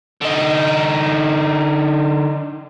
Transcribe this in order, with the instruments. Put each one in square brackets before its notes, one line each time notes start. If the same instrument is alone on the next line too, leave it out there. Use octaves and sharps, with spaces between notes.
[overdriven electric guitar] D3 D#4